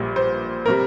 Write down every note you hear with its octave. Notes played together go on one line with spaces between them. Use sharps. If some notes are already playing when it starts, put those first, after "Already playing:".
Already playing: A#1 A#2 G3
C5
C3 G3 A#4